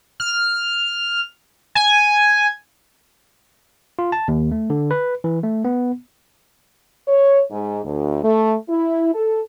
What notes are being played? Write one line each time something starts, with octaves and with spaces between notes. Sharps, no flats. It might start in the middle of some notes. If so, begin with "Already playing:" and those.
F6
G#5
F4
A5
D#2
A3
D3
B4
E3
A3
B3
C#5
G#2
D2
A3
E4
A4